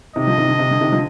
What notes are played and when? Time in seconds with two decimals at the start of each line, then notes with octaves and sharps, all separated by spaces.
0.16 C3 D#3 D#5
0.27 D3 F3
0.38 C3 D#3
0.48 D3
0.59 C3
0.71 D3
0.81 C3 D#3
0.92 D3 F3